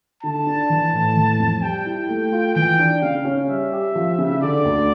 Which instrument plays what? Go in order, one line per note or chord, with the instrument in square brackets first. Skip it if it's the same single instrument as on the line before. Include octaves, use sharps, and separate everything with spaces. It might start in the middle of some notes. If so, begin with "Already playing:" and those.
[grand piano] D3 [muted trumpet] A5
[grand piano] D4
E3
A2
E3
F2
[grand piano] G3 [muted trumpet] G5
[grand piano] E4
A3
F4
[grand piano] E3 [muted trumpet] G5
[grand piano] D4
[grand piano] C#3 [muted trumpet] F5
[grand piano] C#4
[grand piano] G3 [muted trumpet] E5
[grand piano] G4
F3
C#3
[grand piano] D3 [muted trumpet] D5
[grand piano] D2